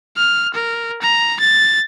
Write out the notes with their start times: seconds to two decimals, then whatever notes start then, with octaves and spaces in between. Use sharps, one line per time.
0.17 F6
0.54 A#4
1.02 A#5
1.40 A6